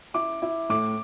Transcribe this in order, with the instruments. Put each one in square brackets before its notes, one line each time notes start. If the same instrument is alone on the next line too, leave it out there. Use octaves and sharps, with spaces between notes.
[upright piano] E4 [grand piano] D6
[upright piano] E4
[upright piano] A2 [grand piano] D6